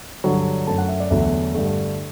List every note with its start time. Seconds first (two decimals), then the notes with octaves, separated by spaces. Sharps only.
0.24 G2 D3 F#3
0.67 F#2 F#3 A3 A5
0.78 F#5
0.89 E5
1.00 D5
1.11 E2 D3 F#3 A3 E5
1.54 G2 D3 A3